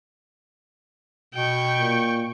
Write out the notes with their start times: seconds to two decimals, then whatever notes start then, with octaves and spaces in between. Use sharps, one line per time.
1.34 B2 G5 C#6
1.79 A#2